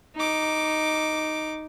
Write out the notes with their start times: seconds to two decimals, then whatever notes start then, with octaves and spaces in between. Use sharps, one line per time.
0.16 D#4 D6